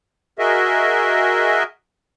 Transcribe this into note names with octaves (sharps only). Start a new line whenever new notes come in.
F#4 G#4 A#4 D#5 E5